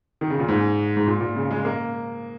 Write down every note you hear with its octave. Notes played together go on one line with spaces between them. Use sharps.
D#3
C#3
A#2
G#2
G#2
A#2
A#2
C#3
G#3
A#3